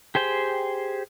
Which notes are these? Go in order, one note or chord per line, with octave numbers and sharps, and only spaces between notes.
G4 G#4 C5 G5